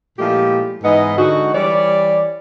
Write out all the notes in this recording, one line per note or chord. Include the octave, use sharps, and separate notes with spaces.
A#2 F3 G#3 A3 E4 G4
G#2 E3 B3 D#5
D3 G#3 D#4 F#4
E3 G3 C#5 D5